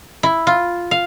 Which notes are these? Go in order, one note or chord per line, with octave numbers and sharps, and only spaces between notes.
E4
F4
F5